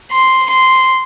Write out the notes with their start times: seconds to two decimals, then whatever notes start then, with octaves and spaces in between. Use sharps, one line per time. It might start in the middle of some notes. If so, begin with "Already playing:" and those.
0.12 C6
0.50 C6